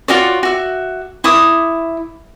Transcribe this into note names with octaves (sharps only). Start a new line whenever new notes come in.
F4 F#4 C#5 D5
F#4 E5
E4 D6 D#6